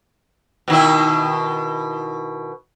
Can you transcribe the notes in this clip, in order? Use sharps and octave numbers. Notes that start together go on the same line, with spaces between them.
B2 D#3 E4